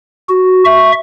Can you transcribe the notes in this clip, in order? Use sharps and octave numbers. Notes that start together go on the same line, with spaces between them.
F#4
E5 C#6